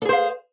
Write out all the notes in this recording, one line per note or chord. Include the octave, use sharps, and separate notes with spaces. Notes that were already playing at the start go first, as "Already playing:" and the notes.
G#4 A4 C5 F5